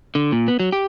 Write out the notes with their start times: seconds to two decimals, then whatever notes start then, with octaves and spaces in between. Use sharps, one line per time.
0.15 D3
0.32 A#2
0.48 B3
0.60 F#3
0.72 G4